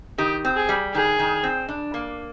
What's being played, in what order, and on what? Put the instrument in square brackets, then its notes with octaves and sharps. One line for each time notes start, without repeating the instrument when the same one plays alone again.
[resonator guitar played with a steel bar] D#3 [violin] G4
[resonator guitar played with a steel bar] C4
[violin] G#4
[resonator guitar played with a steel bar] G3
[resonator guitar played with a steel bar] D#3 [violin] G#4
[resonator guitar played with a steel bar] D#3
C4
D4
A#3